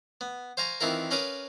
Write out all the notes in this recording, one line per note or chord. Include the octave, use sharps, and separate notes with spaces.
B3
C5 F5 G#5 A#5 C#6
D#3 E3 C4 E4 F4 A#4
C#4 A#4 B4 F5 D6 D#6